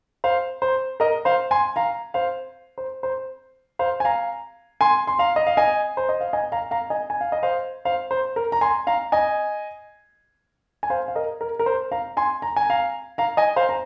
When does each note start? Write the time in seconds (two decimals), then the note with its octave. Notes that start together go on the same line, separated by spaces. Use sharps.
0.24 C5 F5
0.62 C5
1.00 A#4 D#5
1.25 C5 F5
1.51 G#5 C6
1.76 F5 A#5
2.14 C5 F5
2.78 C5
3.03 C5
3.79 C5 F5
4.00 G#5
4.05 F5 A#5
4.81 G#5 C6
5.07 C6
5.19 F5 A#5
5.36 D#5
5.47 F5
5.57 D#5 G#5
5.97 C5
6.09 D#5
6.21 F5
6.33 D#5 G#5
6.52 F5 A#5
6.71 F5 A#5
6.90 D#5 G#5
7.10 G#5
7.21 F5
7.32 D#5
7.43 C5 F5
7.85 C5 F5
8.11 C5
8.36 A#4
8.52 A#5
8.61 G#5 C6
8.87 F5 A#5
9.12 D#5 G#5
10.83 G#5
10.90 C5 F5
11.08 F5
11.16 A#4 D#5
11.41 A#4
11.59 A#4
11.66 C5
11.92 F5 A#5
12.17 G#5 C6
12.42 A#5
12.56 G#5
12.70 F5 A#5
13.18 F5 A#5
13.37 D#5 G#5
13.56 C5 F5
13.69 A#5